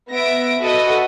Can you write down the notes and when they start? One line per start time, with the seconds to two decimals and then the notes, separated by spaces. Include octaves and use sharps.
0.10 B3 E5 A#6 D7
0.60 F#4 A4 B4 D#5 E5